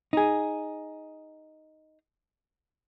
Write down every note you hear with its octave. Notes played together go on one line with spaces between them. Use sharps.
D#4 G#4